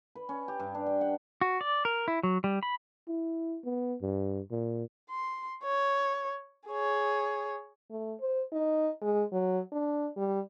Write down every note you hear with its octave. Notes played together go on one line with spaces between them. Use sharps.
B4
C#4
G4
G2
D4
G5
F#5
F#4
D5
A#4
E4
F#3
G3
B5
E4
B3
G2
A#2
C6
C#5
G#4 C#5
A3
C5
D#4
G#3
F#3
D4
G3